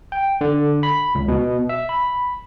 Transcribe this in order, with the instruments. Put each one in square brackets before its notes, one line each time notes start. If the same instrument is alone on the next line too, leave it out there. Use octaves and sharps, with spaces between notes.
[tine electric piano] G5
D3
B5
C#2
B2
E5
B5